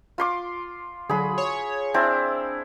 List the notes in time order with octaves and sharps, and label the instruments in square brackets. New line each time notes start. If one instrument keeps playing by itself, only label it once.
[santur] F4 C6 D6
[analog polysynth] D3 F#3 [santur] G#4 B5
[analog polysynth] C#5
[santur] C4 E4 [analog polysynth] D4